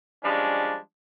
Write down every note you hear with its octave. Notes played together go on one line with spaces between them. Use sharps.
F3 G3 G#3 C#4 D4